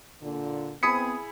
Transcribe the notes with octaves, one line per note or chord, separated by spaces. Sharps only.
A#2 D3
B3 C4 E4 G#4 D#6 B6 C#7